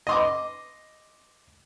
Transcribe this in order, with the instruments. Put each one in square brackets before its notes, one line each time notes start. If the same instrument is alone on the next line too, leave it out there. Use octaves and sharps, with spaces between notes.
[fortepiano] D#5 C6 D6